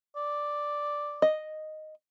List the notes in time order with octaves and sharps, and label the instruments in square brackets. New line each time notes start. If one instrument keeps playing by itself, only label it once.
[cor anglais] D5
[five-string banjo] D#5